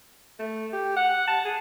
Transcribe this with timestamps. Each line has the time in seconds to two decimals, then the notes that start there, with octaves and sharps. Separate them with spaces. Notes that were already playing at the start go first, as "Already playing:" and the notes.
0.39 A3
0.73 G4
0.97 F#5
1.27 A5
1.45 G#4